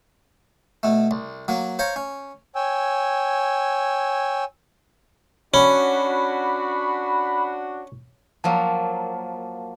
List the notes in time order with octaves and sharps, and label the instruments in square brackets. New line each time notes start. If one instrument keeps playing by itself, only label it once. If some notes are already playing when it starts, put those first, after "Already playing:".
[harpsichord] B2 A3
C2
F#3 A#3
C5 C#5 F5 A#5 C#6
C#4
[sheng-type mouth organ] C#5 G5 G#5 E6
[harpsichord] C#4 [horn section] D4 F#4 [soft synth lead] B5
[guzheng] F3 F#3 A#3 [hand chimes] F5 A5